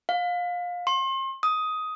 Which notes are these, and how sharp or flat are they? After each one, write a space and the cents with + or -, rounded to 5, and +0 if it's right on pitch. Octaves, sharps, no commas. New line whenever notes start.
F5 +25
C6 +40
D#6 +10